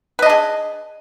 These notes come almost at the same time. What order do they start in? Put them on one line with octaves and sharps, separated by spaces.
B4 D#5 D4 G#4